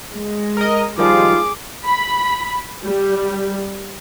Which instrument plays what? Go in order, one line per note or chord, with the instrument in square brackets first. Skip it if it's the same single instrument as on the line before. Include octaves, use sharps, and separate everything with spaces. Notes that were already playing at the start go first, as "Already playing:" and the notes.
[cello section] G#3
[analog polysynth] A#4 D#5
[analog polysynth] D#3 F3 G3 [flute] F4 [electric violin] G#4 D6
[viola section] B5
G3